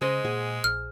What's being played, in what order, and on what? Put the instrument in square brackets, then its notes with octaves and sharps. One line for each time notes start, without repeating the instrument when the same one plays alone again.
[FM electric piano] C#3 [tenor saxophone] G#3 [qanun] C5 D#5
[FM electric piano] A#2 F#5 [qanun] G#4
[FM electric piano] A#1 [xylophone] F6